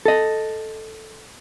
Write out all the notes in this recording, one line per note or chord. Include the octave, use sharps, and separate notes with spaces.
A4 D#5